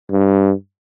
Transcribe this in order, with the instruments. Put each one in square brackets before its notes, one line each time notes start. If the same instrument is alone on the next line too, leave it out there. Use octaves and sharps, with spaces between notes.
[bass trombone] G2